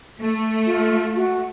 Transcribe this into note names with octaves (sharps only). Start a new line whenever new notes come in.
A3
F4
F#4